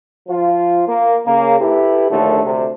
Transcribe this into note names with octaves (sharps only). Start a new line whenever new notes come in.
F3 F4
A#3
C#3 A#3
E4 G4 A4 B4
A#1 D#2 D3 A3
D2 C3